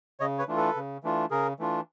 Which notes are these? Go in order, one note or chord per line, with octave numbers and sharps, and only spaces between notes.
C#3 C#5 D#5
B4 C#5
E3 A3 D4 F4
A4 B4
C#3
E3 A3 D4 F4
C#3 G#4 A#4
E3 A3 D4 F4